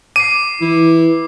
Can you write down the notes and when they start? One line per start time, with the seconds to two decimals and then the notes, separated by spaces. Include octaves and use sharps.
0.16 D6 C7 D#7
0.61 E3 E4